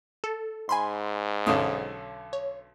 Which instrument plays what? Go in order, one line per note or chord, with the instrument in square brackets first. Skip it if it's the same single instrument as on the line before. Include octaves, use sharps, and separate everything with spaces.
[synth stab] A4
[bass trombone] G#2 [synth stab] G#5 B5 C6
[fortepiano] B1 D3 C#4 [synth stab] D#6
[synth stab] C#5